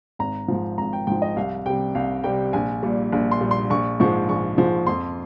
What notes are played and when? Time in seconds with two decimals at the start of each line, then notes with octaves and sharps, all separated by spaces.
0.19 G#1 A#5
0.48 G#2 F3
0.78 G#1 A#5
0.93 G5
1.07 G#2 F3 G5
1.22 D#5
1.36 C2 F5
1.66 C3 G3 G5
1.95 C2 F5
2.24 C3 G3 G5
2.53 A#1 G#5
2.83 A#2 G3
3.12 A#1
3.32 C6
3.41 A#2 G3
3.51 C6
3.70 A#1 C#6
4.00 G#2 F3 G#3 C#6
4.29 A#1 C#6
4.58 G#2 F3 G#3
4.87 F2 C6